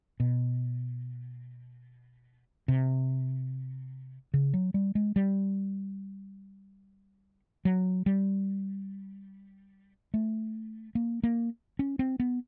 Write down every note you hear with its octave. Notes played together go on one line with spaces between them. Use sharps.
B2
C3
C#3
F#3
G3
G#3
G3
F#3
G3
A3
A#3
A#3
C#4
C4
B3